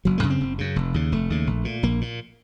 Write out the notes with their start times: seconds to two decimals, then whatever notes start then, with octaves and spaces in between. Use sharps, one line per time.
0.05 F#1 F#3
0.18 A3
0.23 F#2 C#3
0.30 C4
0.41 F#1
0.58 F#2 C#3
0.76 F1
0.94 D#2 C#3
1.12 F1 A3
1.30 D#2 C#3
1.47 A#1
1.65 A#2
1.83 A#1 A#3
2.01 A#2